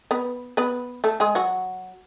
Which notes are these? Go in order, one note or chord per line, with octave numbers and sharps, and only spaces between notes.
B3 B4
B3 B4
A3 A4
G#3 G#4
F#3 F#4